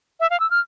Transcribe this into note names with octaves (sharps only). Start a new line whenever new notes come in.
E5
F5
E6
F6